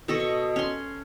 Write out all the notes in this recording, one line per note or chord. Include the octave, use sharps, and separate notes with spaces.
B2 A4 D#5 C#6
C#6
C#4 C6